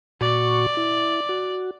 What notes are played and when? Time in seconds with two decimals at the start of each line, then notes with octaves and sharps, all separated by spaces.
0.21 A#2 F#4 D5 C#6
0.77 E4
1.29 F#4